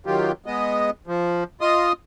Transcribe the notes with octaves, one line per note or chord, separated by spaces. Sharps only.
D#3 F#3 F4 G4
G#3 B3 D#5
F3
F4 D#5 C6 D#6